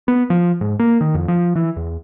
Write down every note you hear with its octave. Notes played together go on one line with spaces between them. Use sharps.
B3
F3
G#2
A#3
D#3
F2
F3
E3
E2